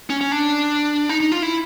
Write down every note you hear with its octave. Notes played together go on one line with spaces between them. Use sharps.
C#4
C#4
D4
D#4
D#4
F4
E4